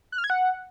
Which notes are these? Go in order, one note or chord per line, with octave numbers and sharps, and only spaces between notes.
F#6
F6
G#6
F#5